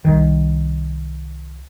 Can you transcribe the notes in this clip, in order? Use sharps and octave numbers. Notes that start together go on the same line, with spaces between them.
C2 D#3